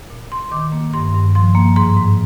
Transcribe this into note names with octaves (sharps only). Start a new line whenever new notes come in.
A#2
A#2 C6
D#3 D6
A#3
G2 C6
G2
F3 C6
A#3
G#2 C6
G#2